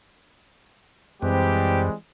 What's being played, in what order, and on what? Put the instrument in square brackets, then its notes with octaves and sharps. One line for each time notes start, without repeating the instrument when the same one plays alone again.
[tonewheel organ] F#2 [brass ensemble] E3 G3 C4 [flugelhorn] G#3 [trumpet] G4